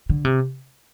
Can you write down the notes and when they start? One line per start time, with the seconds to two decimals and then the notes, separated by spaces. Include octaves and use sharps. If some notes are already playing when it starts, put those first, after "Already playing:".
0.09 D3
0.25 C3